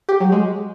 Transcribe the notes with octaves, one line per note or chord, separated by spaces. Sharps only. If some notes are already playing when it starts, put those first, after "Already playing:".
G4
F#3
G#3